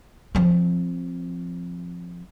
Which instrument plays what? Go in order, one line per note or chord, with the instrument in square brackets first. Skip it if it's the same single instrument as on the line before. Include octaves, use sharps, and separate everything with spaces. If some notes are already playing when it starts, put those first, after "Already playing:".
[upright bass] F3 C4